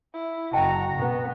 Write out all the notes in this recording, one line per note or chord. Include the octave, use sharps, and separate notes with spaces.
E4
F#1 F#4 D#5 G5 A5 A#5
B2 B3